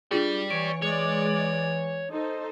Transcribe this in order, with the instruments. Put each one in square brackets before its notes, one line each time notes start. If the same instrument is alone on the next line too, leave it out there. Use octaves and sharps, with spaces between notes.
[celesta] D4 F4 G#4 [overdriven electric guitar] D5 G5
[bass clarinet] E3 [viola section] C#5 [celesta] D7
[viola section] G#3 D5 [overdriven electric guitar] C#5
[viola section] D#4 A4 C5